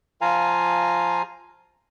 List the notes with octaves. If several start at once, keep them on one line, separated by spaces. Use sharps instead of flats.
F3 F4 F5 G#5 A#5